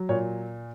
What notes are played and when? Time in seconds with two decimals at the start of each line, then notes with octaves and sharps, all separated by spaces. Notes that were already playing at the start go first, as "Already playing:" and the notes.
Already playing: F#3
0.09 A#2 C#5